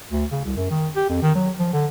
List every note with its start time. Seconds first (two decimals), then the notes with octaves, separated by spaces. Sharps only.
0.11 D2
0.32 C#3
0.44 C2
0.57 F#2
0.70 D#3
0.96 G4
1.09 F2
1.23 D#3
1.35 F#3
1.59 F3
1.73 D3